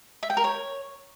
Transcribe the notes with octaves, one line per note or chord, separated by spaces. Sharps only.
E5
G5
A#4
C#5